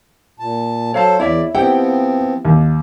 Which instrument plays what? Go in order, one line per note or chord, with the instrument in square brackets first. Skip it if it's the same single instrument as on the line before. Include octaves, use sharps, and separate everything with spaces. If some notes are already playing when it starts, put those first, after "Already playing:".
[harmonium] A#2 A5
[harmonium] F#3 A4 C5 [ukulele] C#5 F5 A5
[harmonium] E2 D5 [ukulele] E4 C#5 E5
[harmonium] F3 B3 C4 [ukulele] E4 G4 F#5 [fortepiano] G5
[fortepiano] D#2